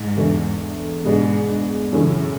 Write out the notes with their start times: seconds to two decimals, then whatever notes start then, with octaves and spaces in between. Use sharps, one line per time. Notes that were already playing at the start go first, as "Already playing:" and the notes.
Already playing: G#2
0.17 E2 D3 A3
1.04 G#2 B2 G#3 B3 D4 G#4
1.48 G#2
1.92 F#2 A2 C#3 E3 A3 E4